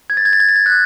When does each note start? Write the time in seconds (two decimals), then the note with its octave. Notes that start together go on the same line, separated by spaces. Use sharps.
0.10 G#6
0.17 A6
0.25 G#6
0.33 A6
0.40 G#6
0.49 A6
0.56 G#6
0.66 F#6